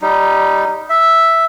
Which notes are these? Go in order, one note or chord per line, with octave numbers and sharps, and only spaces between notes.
G3 D#4
E5